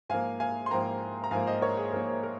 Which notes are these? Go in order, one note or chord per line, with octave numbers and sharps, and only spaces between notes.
G#2 F3 A#3 F5 G#5
F5 G#5
C6
G#2 F3 A#3 G5 A#5
A#5
G#2 F3 A#3 F5 G#5
C5 D#5
A#4 C#5
G#4
G#2 F3 A#3 A#4
A#4